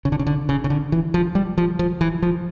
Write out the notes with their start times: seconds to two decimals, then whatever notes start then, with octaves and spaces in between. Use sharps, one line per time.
0.05 C#3
0.12 D3
0.19 C#3
0.27 D3
0.49 C#3
0.64 C#3
0.70 D3
0.92 E3
1.14 F3
1.35 G3
1.58 F3
1.79 F3
2.01 E3
2.22 F3